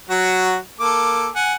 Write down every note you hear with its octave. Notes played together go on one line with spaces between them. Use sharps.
F#3 F#4
A#3 A4 D6
F#5 G#5